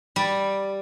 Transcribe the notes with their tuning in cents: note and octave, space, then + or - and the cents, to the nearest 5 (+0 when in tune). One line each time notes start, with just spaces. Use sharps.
G3 +0 D5 +0